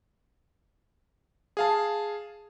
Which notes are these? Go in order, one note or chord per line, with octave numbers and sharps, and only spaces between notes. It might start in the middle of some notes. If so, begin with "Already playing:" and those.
G#4 F5 A5